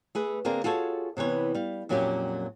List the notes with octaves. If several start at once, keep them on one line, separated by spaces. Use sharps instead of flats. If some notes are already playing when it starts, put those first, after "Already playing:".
A3 G#4 B4
D3 A#3 C4 D4 G#4 A#4
F4 F#4 G#4 A4 C5 C#5
C3 E3 B3 C#5
G3 F5
F2 A#2 F#3 A#3 C#4 G4